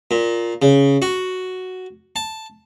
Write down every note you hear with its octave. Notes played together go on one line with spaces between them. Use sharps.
A#2
C#3
F#4
A5